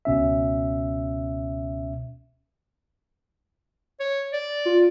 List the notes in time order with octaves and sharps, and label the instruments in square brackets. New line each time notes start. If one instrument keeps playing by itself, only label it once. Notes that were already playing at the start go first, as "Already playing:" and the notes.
[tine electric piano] C#2 B2 C#4 E5
[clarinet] C#5
D5
[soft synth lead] F4